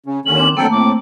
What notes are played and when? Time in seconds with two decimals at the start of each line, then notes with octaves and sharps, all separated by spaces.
0.06 C#3 C#4
0.26 D#2 D3 D#3 C#4 F#7
0.37 C4 D6
0.57 D3 F#3 A3 A#3 C4 A4 G5
0.71 A2 C4 D6